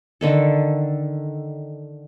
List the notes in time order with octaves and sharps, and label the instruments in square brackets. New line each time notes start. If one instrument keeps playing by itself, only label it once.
[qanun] D3 D#3 A4